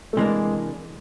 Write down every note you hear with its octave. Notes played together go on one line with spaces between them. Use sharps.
A3
C3 E3 G3 G#3 A#3 D4